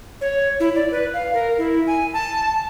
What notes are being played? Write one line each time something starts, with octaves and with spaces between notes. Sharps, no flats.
C#5
E4
D5
B4
F5
A#4
E4
G#5
A5